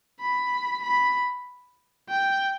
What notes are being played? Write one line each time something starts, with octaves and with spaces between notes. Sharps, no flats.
B5
B5
G5